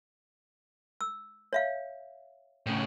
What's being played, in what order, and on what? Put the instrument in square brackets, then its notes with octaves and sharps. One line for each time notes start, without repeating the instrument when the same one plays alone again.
[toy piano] E6
C#5 E5 F5
[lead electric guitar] A2 C#3